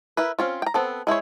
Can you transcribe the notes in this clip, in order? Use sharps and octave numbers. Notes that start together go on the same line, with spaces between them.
E4 A#4 B4
C4 C#4 F4
G5 A#5
B3 C4 A4
G#3 E4 C5 C#5